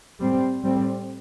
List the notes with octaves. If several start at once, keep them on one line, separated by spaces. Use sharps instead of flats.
A2 G3 C4
A2 G3 C4